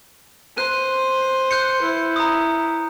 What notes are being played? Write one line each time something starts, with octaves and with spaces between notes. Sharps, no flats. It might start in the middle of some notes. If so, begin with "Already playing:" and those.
C5 F#6 D#7
F#6 G6 C#7
E4
A#5 D#6